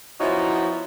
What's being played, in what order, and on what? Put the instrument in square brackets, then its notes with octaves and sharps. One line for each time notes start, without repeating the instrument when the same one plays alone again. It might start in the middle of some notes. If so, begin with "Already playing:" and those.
[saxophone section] F3 B3 C#4 D#4 E4 F#4